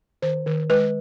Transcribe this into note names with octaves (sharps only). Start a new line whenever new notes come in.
D#3 C5
D#3
G#3 B4